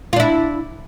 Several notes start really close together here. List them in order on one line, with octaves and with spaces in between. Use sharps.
F4 D4 E4